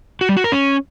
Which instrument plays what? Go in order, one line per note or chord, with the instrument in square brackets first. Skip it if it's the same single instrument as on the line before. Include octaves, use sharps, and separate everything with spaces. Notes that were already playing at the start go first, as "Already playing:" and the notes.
[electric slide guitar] F#4
G3
F#4
A#4
C#4